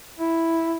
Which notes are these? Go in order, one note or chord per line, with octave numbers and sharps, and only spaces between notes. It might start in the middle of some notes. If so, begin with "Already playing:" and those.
E4